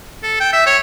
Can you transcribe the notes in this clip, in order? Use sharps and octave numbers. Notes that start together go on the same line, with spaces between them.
A4
G5
E5
C#5